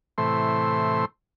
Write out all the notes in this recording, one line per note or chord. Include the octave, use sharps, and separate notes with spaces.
A2 C3 E3 A3 C5 C6